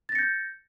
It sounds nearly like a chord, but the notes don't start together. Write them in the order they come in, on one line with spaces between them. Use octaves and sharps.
A6 A#6 C#7 G6